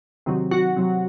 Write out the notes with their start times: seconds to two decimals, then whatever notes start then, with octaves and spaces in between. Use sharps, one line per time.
0.26 C3 D#3 F#3
0.51 F#4
0.76 C3 F#3